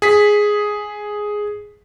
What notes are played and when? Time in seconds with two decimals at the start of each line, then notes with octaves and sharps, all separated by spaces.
0.02 G#4 B6